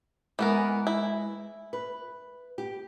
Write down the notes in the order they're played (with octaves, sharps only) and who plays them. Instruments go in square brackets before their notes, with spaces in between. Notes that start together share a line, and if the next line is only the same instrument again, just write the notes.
[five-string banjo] E3 B3 A#4 [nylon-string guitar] G#3 B4
[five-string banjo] E4
[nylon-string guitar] B4
G4